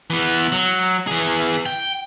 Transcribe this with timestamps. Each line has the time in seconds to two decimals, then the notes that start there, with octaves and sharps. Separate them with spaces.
0.10 E3 B3
0.52 F#3
1.07 E3 G#4
1.66 G5